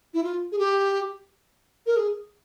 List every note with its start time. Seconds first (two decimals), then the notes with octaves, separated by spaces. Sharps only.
0.14 E4
0.24 F4
0.52 G#4
0.59 G4
1.86 A#4
1.97 G#4